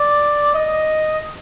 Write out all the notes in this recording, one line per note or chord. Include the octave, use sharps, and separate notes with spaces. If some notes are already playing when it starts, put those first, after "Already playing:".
Already playing: D5
D#5